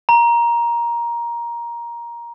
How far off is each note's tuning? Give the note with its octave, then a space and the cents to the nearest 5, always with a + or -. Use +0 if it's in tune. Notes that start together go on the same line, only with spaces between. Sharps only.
A#5 +15